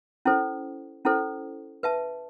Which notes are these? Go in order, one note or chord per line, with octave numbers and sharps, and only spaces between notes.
C#4 E4 A4 C5
C#4 E4 A4 C5
B4 E5 A5